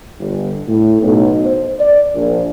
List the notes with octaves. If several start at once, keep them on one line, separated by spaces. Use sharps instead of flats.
G1
A2
B1
C5
D5
A#1